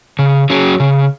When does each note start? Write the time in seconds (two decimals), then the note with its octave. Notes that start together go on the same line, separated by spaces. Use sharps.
0.19 C#3
0.50 F#3 C#4 G#4
0.80 C#3